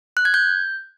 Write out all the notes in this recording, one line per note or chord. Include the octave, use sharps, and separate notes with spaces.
F#6
G#6
G6